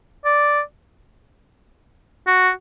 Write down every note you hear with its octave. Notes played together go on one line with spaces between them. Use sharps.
D5
F#4